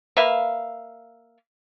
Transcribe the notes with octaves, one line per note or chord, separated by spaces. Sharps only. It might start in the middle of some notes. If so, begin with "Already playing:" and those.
A#3 B4 E5 F5